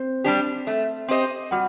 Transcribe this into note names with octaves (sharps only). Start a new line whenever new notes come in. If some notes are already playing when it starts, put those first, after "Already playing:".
Already playing: C4 C5
G3 D4 G4
A3
C4 G4 C5 D#5
G3 F#4 F#5